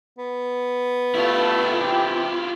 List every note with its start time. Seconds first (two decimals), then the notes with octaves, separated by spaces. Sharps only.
0.18 B3
1.15 G2 A3 E4 F4
1.79 C3 E3 G4